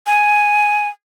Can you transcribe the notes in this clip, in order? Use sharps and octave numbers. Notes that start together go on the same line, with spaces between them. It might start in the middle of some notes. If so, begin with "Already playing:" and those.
G#5